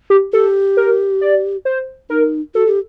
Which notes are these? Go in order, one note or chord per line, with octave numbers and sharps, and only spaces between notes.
G4
G4 A4
A#4
D5
C5
D#4 A#4
F#4 A4
G4